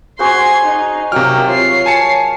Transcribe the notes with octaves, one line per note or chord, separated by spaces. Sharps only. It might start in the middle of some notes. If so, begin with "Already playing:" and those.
F#4 G#4 C5 C6 G#6
D#4
C3 F#3 A#3 G5 F6
F4 C#5 C7
G#5 A5 C#7